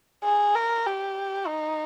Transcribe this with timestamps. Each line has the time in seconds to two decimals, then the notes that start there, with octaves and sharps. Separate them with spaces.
0.24 G#4
0.55 A#4
0.86 G4
1.47 D#4